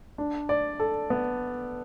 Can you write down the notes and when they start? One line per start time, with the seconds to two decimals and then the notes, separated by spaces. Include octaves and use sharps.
0.18 D4
0.49 D5
0.80 A4
1.10 B3